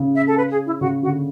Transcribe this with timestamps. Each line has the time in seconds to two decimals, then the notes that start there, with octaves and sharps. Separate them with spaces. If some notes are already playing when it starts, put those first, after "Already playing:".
Already playing: C#3
0.15 E5
0.27 A4
0.37 B4
0.51 G#4
0.66 E4
0.80 C#3 F#4
1.02 D3 F#4